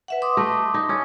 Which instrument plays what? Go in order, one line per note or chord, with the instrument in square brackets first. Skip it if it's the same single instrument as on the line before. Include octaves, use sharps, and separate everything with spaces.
[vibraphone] B4 E5 F#5
C6 D6 D#6
[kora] A3 D#5
D#4
C#4